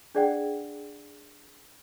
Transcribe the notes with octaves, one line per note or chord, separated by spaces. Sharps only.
D4 G#4 D5 F#5 G5